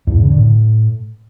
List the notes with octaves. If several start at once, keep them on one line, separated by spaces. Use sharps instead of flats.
E2
G#2
C#3
D3
A2